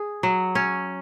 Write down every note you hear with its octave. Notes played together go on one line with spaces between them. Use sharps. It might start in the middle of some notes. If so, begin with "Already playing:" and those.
Already playing: G#4
F#3
C#4